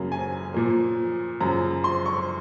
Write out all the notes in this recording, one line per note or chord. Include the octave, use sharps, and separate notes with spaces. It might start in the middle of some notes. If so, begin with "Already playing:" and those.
Already playing: F#2 C#3 F#3 A#3
G#5
A#2 F3 A#3
F#2 C#3 F3 A#5
C6
C#6